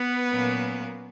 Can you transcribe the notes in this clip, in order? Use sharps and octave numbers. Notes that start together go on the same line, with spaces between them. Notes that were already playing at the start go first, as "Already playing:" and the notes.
Already playing: B3 B4
A#2 F#3 A#3 C#4